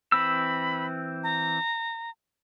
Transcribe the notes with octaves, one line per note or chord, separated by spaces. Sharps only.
E3 C4 B5 E6
A#5